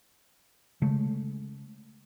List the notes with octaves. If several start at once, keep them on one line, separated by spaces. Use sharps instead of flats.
C#3 G#3 A3